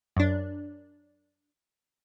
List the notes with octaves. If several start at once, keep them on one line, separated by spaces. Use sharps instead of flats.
F#2 D4